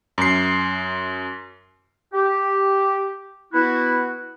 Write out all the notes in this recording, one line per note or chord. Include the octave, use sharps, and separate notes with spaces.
F#2 C7
G4
B3 E4 F#4